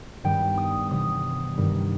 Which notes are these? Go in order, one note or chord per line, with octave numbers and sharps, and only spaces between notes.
G2 D#3 G3 B3 G5
D#6
C3 E3 G3 B3 D#6
G2 D#3 G3